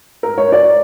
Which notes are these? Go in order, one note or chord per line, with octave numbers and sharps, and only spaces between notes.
A#4
C#5
D5